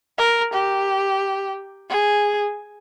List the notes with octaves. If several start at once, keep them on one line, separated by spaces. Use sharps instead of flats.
A#4
G4
G#4